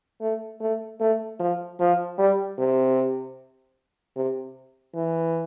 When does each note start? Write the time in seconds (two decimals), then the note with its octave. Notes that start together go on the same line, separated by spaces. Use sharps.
0.21 A3
0.61 A3
1.00 A3
1.39 F3
1.80 F3
2.19 G3
2.59 C3
4.16 C3
4.95 E3